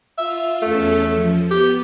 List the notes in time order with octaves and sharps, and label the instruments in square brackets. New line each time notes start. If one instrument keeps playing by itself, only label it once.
[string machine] F4 [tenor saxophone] E5
[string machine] E2 C#4 A4 [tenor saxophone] A3
[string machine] F3
[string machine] B3 [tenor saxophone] G4